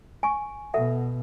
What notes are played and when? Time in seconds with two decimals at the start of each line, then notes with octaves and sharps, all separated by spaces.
0.23 G#5 C#6
0.74 B2 A4 E5 F#5